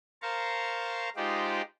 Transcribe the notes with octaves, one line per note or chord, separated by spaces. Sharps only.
A#4 C5 F5 A5 A#5 C#6
G#3 D#4 F4 G4 C5 D5